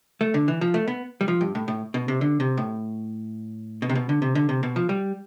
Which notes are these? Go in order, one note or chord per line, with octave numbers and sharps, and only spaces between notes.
A3
D3
E3
F3
A3
B3
G3
F3
G2
A2
A2
B2
C3
D3
C3
A2
B2
C3
B2
D3
C3
D3
C3
B2
F3
G3